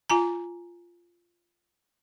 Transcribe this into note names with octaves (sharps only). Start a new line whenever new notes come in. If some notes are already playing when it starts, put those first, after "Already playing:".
F4 G#5 A#5